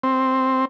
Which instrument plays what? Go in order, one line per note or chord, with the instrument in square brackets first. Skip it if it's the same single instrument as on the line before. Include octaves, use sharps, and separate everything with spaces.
[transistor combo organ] C4